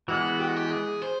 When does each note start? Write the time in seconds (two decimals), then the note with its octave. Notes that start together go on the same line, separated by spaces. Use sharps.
0.08 E3 G#3 B3 F#4
0.40 G4
0.47 F#4
0.56 G4
0.71 G#4
1.02 C5